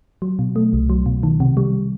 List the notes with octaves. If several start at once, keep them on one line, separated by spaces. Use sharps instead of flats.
F#3
B2
A3
C2
F#3
B2
D#3
C3
G3